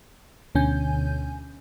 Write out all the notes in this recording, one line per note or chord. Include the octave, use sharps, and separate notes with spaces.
D2 B2 D3 C#4 G#5 G6